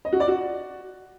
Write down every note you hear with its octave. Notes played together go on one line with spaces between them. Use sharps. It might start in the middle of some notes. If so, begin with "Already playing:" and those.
D#5
F#4
D5
F#4